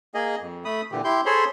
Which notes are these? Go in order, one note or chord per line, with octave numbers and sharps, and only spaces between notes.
A#3 G#4 D#5
F2
A3 B5 D#6
A#2 D3 E3 G4
E4 G4 C6 G6
G#4 A4 C5 C#5 B5 C6